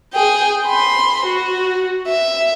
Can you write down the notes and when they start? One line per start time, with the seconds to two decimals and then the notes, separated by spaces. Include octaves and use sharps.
0.14 G#4 G5
0.67 B5 C6
1.26 F#4
2.07 E5